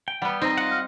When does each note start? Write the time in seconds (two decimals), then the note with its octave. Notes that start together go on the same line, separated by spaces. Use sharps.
0.08 G5
0.22 G3 B3 F#5 B5
0.42 C4 D#4 D#5 A#5
0.58 F4 F#5
0.71 F6